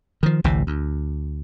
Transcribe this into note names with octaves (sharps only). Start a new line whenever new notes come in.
D#3 F3
A1 D2 A2 C3
D2